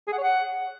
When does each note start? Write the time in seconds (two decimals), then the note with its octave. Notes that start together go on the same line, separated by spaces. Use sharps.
0.07 G#4
0.13 F#5
0.18 C#5
0.23 F#5